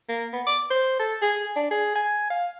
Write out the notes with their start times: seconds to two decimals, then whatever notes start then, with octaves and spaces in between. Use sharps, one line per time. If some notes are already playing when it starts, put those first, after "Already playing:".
0.09 A#3
0.33 B3
0.47 D6
0.71 C5
1.00 A4
1.22 G#4
1.56 D4
1.71 G#4
1.96 G#5
2.30 F5